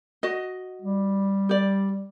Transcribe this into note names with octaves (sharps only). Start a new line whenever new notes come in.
F#4 D#5
G3
G4 D5